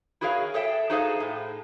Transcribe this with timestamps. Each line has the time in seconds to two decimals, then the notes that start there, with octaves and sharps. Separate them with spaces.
0.21 E4 F#4 G#4 A#4 C#5 F5
0.54 G#4 A4 C#5 E5 G5
0.90 D#4 F#4 G#4 A4 C5 F5
1.20 A2